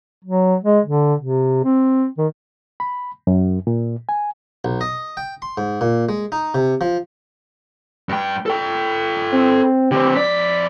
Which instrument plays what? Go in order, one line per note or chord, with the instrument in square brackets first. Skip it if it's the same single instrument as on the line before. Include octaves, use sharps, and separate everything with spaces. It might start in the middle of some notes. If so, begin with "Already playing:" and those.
[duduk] F#3
G#3
D3
C3
C4
D#3
[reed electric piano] B5
F#2
A#2
G#5
[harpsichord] B1
D#5
G5
C6
G#2
A#2
G#3
D#4
C3
F3
[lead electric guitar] G2 G5
A4 G5
[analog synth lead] C4
[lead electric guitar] D3 C4 [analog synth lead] G4
[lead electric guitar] F2 D5 [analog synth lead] B6